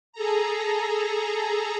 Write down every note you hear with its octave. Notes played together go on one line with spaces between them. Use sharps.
G#4 A4 A#5